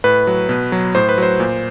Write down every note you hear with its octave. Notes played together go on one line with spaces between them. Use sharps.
A2 B4
F#3
B2
F#3
A2 C5
B4
F#3 C5
A#2